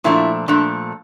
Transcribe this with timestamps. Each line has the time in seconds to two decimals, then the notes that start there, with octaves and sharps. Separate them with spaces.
0.04 A#2 F3 A3 D4 E4
0.48 A#2 F3 A3 D4